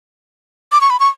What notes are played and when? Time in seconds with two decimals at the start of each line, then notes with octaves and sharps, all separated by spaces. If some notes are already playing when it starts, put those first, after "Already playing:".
0.72 D6
0.81 C#6
0.90 B5
1.00 C#6